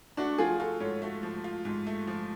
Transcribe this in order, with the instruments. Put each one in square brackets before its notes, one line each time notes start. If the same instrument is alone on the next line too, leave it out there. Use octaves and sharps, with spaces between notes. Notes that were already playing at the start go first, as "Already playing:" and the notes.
[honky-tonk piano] A3 [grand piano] D4 F#4
[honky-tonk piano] F3 [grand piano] F4 G#4
[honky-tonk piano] F4 [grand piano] F#4 A4
[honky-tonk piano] G#2 [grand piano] A4 C#5
[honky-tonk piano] A3 [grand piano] F#4 A4
[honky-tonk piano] F3
F4
G#2
A3
F3